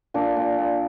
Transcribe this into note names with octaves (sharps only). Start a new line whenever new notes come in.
A#2 D4
A#2
A#2